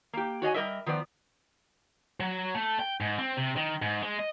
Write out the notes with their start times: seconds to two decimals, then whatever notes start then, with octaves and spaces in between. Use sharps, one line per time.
0.13 A#3 G4
0.42 F#4 C#5 D#5 G#5
0.54 G3 B3 A#4 D#5 E5
0.86 D#3 F3 B3 D5
2.20 F#3
2.55 A3
2.79 G5
3.01 G#2
3.19 C4
3.37 C3
3.56 D#3
3.82 G#2
4.03 G#3
4.19 D#5